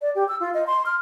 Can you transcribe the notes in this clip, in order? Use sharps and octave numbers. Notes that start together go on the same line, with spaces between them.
D5
G4
E6
F4
D#5
C6
F6